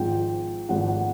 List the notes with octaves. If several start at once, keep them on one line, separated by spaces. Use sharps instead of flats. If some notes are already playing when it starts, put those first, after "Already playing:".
Already playing: G#1 G#2 F3 G5
G#1 G#2 F3 F#5
F#5